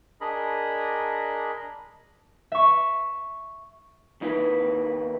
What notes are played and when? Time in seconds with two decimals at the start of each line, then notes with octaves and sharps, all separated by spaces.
0.21 D4 G#4 A#4 D#5 B5
2.52 E5 C#6
4.21 D#2 D#4 E4 B4